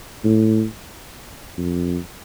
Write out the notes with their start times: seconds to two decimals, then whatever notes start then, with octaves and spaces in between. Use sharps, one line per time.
0.24 A2
1.58 F2